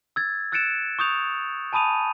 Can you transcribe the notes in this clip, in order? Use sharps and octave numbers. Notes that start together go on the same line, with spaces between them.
E6 G#6 A6
E6 F#6 A6 C#7 D7 E7
C#6 D#6 G6 F7
G#5 A5 B5 D#6 D#7 F7